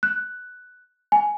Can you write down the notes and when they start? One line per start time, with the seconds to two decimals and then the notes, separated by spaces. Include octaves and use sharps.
0.03 F#6
1.12 G#5